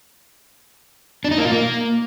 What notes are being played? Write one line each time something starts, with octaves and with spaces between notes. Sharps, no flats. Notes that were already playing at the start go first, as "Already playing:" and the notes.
D4
D#4
A#3
F4
A#3